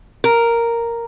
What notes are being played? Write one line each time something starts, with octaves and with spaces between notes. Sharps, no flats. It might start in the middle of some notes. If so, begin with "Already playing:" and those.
A#4